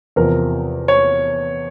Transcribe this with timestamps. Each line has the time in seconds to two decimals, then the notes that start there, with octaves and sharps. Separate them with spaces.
0.16 E2 C3 F3 A#4
0.88 C#5